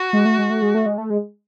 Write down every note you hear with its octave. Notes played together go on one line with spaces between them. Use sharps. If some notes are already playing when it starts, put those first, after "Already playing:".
Already playing: F#4
G#3
A3
G#3
A3
G#3
A3
G#3
A3
G#3